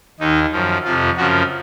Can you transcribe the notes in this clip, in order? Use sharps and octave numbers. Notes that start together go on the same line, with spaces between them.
D#2 D#3 D#4
F#2 F3
F2 C3 F3 F4
F#2 C#3 F3 F#4